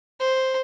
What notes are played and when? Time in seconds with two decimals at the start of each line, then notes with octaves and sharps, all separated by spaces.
0.20 C5